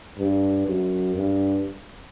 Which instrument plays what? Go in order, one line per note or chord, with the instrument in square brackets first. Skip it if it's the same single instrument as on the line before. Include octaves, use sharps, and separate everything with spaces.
[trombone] G2
F#2
G2